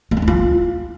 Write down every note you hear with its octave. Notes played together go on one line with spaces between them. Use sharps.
A#3
C4
D4
F4